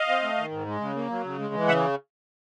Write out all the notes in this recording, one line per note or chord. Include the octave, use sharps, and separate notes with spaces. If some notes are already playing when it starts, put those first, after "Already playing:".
Already playing: D#5 F5
C4
A3
D#3
G#2
G#3
C#3
A#3
F#3
C#3
G#3
E3
C#3 E5 F#5